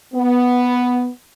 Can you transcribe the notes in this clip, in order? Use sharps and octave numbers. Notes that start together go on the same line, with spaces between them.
B3